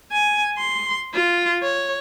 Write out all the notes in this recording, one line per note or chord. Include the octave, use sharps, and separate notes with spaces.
G#5
C6
F4
C#5